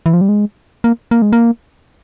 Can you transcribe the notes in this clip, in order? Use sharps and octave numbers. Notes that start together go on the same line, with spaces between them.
E3
F3
G3
G#3
A#3
A#3
G#3
A#3